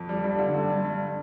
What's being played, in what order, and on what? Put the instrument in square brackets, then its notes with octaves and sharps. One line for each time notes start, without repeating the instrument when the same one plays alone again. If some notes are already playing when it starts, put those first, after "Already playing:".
Already playing: [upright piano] F2
G3
G2
D3
G2
G2
G2